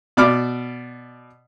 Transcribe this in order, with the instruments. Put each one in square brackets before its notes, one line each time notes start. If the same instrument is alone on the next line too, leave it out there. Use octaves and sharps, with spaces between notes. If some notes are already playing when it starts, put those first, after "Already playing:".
[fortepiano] B2 D5 B5 D6 F6